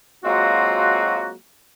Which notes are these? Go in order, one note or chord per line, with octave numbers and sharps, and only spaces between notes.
F#3 G#3 A#3 C4 F4 F#4